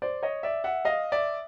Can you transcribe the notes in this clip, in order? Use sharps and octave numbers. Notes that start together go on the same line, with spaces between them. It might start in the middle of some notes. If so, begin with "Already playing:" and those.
C5 D5
C#5 D#5
D5 E5
E5 F#5
D#5 F5
D5 E5